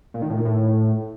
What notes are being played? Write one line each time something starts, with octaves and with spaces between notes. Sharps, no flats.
A#2
D#3
A2
A#2
A2